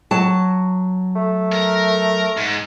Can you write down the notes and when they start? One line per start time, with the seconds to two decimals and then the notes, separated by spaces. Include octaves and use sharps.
0.11 F#3 A5
1.16 A3
1.52 A#4
2.37 G#2